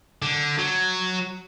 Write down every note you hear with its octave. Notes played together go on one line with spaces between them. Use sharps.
D3
F#3